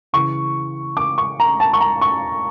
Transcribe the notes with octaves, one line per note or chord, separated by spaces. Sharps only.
C#3 E3 C#6
D6
C#6
A#5
A5
C#6
A#5
C#6